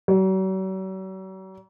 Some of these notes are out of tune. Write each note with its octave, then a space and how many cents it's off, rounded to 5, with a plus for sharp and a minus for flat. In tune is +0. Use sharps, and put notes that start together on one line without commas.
F#3 +45